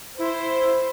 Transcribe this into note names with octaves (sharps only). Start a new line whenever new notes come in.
E4 C5